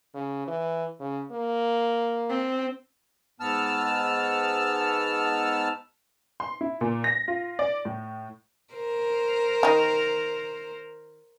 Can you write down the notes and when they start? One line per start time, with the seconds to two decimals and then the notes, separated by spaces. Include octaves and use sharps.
0.14 C#3
0.47 E3
1.00 C#3
1.31 A#3
2.30 C4
3.40 G#2 B3 A5 E6 F6
6.40 C6
6.61 E4
6.81 A#2
7.04 A#6
7.28 F4
7.59 D5
7.85 A2
8.74 A#4 C5
9.63 D#3 D#4